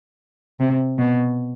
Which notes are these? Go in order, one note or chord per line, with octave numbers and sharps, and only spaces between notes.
C3
B2